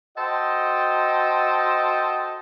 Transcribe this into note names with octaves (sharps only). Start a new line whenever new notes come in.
F#4 A4 C5 D#5 G5